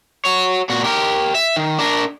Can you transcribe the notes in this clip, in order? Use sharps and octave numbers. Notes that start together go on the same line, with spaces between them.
F#4 C#5
A#2 F#4
G4 A#4
E5
D#3
D4 A#4